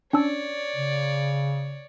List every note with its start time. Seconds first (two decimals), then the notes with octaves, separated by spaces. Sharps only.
0.13 C#4 D4 C#5 D5 E6
0.76 C#3